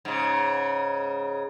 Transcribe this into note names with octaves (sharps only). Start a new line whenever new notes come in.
G#2 C#3